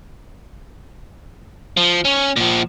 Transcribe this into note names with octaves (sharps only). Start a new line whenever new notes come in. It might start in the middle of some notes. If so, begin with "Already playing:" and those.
F3
C#4
A#2 F3